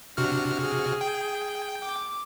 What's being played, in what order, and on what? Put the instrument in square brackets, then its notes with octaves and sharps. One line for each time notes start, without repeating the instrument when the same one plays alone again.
[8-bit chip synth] C3 F#4 F6 [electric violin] D4
[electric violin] G#4
[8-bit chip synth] G5
[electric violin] D6